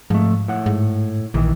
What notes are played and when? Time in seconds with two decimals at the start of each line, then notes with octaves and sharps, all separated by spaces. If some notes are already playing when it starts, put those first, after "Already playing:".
0.10 G#2 F3 A3
0.48 A2 F#5
0.66 G#2
1.34 A#1 D#3 E3